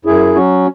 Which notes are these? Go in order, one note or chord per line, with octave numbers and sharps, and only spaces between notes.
F#2 E4 G#4
F#3 C#4 F#4